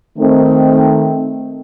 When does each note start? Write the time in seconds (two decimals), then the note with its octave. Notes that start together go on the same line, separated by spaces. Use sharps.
0.18 D#3 A3 C4